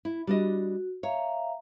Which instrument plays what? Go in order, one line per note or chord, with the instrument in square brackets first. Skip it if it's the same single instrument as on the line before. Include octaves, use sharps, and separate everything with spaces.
[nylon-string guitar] E4
[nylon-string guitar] G3 D4 D#5 [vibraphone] F#4
[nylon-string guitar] C#5 [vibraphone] E5 F5 A#5